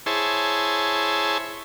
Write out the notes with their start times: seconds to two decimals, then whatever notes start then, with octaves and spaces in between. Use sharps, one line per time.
0.06 E4 G#4 C5 C#5 A5